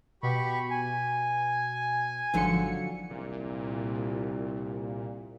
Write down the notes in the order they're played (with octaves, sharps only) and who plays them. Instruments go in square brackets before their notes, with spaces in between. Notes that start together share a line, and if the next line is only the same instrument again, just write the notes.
[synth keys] B2 [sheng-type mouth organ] G4 B5 C#6
[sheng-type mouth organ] G#5
[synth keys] G#1 C#7 [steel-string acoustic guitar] D3 F3 F#3
[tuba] C2 [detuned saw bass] A#2